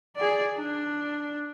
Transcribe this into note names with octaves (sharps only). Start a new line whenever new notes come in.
G#4 D5
D4